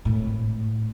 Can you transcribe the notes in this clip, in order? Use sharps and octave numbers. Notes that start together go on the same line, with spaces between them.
G#1 A2